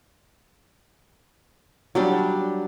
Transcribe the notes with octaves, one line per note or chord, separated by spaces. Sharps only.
F#3 G3 D4